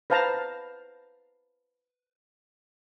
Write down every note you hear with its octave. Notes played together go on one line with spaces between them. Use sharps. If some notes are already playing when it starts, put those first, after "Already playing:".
B4 C5 F5 A5 A#5